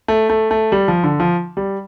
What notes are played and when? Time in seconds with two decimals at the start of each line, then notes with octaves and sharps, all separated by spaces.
0.08 A3
0.30 A3
0.51 A3
0.72 G3
0.88 F3
1.03 D3
1.20 F3
1.57 G3